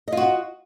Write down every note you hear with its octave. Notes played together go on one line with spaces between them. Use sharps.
F4 F#4 D#5